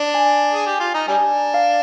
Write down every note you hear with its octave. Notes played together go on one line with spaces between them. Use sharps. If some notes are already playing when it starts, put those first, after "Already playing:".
Already playing: D4
G#5
G#4
G4
F4
D#4 A#5
G3 D4 G#5
F5